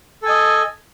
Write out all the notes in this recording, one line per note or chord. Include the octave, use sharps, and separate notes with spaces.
A4 D#5 G#5